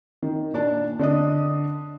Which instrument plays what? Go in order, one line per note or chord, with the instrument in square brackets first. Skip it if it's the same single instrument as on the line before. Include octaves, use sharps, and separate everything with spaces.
[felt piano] D#3
A#2 D4 A5
D3 D4 D#5 D#6